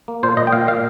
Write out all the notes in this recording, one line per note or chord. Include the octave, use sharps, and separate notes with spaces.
A#3
A#2 C5
A#2 D#5
G5
A#2 F5
A#2 F5